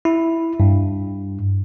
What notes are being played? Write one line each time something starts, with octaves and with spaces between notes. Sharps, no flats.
E4
G2